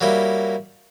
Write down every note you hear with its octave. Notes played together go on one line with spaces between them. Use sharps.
F#3 G3 A#3 E4